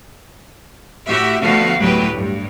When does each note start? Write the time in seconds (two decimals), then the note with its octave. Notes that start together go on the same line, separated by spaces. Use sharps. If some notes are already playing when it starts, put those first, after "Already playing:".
1.07 A2 F#4 G4 E5
1.41 D3 F3 A3 B3 F#4 F5
1.78 D2 A2 F#3 B3 G4 B4
2.15 G2